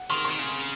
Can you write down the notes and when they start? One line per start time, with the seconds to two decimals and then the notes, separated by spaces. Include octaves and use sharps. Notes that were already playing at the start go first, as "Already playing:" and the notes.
Already playing: F#5
0.10 D#3 C6
0.25 C6
0.31 D#3
0.39 C#3